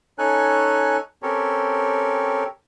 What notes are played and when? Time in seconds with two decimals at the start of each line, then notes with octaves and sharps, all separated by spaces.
0.19 C#4 D#4 A4 C#5 G#5 F#6
1.23 C4 C#4 G4 A4 A#4 C#5